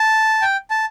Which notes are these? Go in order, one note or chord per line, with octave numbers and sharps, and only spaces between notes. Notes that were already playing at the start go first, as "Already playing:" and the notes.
Already playing: A5
G5
A5